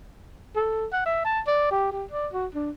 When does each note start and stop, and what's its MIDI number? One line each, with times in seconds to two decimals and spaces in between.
0.56 0.85 69
0.92 1.01 78
1.06 1.20 76
1.25 1.40 81
1.47 1.67 74
1.71 1.89 67
1.92 2.04 67
2.11 2.27 74
2.33 2.46 66
2.54 2.70 62